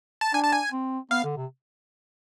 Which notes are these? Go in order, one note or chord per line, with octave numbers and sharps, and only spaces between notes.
A5
D4 G#5
A5
G#5
C4
B3 F5
D3
C3